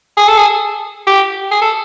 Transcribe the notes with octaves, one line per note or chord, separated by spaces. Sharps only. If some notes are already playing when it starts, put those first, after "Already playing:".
G#4
A4
G#4
G4
G#4
A4